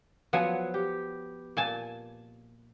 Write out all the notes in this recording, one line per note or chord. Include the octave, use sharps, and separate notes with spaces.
F3 F#3 B3 F#5 G#5
G4
A#2 G#5 A5